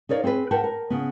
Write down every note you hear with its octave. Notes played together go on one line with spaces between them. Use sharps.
D#4 A#4 C#5 D5 F5
C4 G#4 A4 B4
A#4 B4 F#5 G5 A5
A#4
C#3 B3